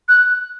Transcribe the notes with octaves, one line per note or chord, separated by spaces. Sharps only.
F#6